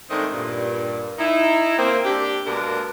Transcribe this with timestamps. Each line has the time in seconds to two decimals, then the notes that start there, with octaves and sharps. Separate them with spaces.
0.10 D#3 G#3 A3 C4 D4 D#4
0.33 G2 A#2
1.19 D#4 E4
1.78 A#3 C4
2.05 D4 G4
2.46 B2 G#3 A#3 B3 D4 A#4